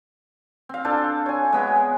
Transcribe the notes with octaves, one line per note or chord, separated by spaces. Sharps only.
C4 F5
D4 F4 A4 C5
C#5 G#5
G#3 B3 G#4